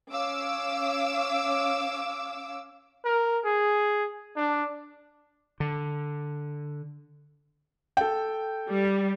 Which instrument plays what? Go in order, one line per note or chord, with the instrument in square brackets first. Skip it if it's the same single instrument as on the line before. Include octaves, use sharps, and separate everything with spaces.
[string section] C#4 F5 D6 E6
[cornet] A#4
G#4
D4
[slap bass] D3
[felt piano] A4 G5
[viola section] G3